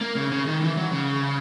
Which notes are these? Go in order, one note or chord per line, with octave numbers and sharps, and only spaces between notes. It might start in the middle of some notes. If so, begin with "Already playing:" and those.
A#3
C#3
C#3
D#3
E3
F#3
C#3